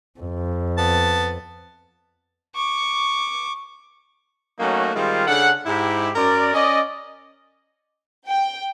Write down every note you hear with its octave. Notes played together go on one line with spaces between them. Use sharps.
F2
B3 A5
C#6 D6
F#3 A3 A#3 C#4 D#4 F#4
D#3 G3 G#3 C4 F4
C#3 D4 A4 F#5
G#2 E4 G4
F#2 A#4 D5
C#4 D5 D#5
G5